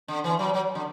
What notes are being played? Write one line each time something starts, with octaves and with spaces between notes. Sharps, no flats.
D3
E3
F#3
F#3
D3